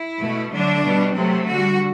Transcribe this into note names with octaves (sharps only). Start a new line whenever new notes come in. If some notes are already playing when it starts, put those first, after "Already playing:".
Already playing: E4
B2 A3
D3 F#3 A3 D4
B2 G3
C3 F#3 A3 C4
D3 G3 F#4